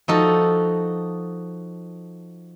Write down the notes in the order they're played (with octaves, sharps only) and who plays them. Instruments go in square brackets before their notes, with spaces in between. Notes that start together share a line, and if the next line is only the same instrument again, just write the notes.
[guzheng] F3 D#4 F#4 A4